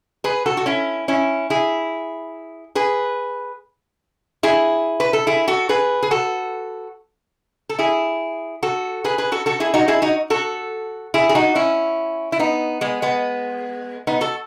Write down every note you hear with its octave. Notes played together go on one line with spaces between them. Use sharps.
G#4 B4
F#4 A4
F#4
C#4 E4
C#4 E4
E4 G#4
G#4 B4
E4 G#4
B4
A4
E4 G#4
F#4 A4
G#4 B4
G#4
F#4 A4
A4
E4 G#4
F#4 A4
G#4 B4
G#4 B4
F#4 A4
F#4 A4
E4 G#4
D#4 F#4
E4 G#4
D#4 F#4
F#4 A4
E4 G#4
G#4
D#4 F#4
C#4 E4
E4
B3 D#4
G#3 B3
G#3 B3
B3 D#4
F#4 A4